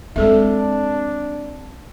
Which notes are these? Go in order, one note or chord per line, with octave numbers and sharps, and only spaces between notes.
G#3 C4 D4 A4 E5